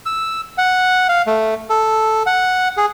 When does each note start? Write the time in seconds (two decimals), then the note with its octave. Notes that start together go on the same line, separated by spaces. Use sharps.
0.06 E6
0.58 F#5
1.09 F5
1.27 A3
1.70 A4
2.26 F#5
2.77 G#4